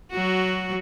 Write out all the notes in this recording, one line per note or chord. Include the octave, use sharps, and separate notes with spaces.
F#3 F#4